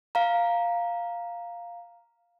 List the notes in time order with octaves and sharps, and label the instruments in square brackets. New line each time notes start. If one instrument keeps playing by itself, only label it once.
[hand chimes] F5 A#5